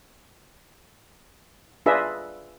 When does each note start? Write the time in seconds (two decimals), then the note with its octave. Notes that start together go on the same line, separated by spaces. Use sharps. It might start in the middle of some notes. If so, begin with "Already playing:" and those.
1.86 D4 F4 G#4 B4 D#5 E5